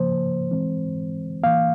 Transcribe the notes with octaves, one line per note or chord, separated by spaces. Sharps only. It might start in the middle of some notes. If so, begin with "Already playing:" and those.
Already playing: C#3 F3 A#3 C5
E3 G#3 C4
E3 A#3 F5